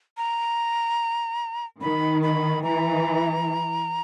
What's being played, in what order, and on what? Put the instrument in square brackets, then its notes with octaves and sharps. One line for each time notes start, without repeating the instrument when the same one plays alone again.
[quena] A#5
[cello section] D#3 [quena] B5
[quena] B5
[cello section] E3 [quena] A#5